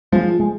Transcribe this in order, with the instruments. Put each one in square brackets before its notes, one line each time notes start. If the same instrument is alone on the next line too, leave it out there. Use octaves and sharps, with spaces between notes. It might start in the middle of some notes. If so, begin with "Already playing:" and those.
[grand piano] F3 [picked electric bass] G#3
[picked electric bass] G#3